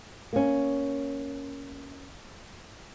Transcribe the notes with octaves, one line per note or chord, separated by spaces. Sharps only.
A#3 C#4